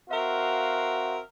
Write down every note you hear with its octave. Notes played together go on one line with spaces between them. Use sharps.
C4 F#4 A#4 E5 F5